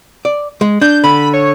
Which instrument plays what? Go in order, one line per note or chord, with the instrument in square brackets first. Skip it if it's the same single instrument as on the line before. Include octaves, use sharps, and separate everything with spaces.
[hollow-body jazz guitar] D5
G#3
[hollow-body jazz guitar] D4 [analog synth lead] G6
[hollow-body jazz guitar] D3 [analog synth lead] B5
[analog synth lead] C#5